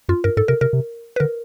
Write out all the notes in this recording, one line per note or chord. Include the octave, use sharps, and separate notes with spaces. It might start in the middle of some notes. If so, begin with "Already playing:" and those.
F#2 F4
G2 A#4
G#2 A4
C3 A#4
C3 A#4
C3
B4
D3 A#4